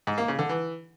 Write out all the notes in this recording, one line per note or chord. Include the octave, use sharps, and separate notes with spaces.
G#2
A#3
C#3
D3
E3